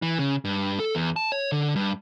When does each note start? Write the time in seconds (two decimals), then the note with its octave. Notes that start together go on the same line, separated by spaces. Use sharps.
0.02 E3
0.18 C#3
0.45 G2
0.80 A4
0.95 E2
1.16 A5
1.32 C#5
1.52 D3
1.76 G2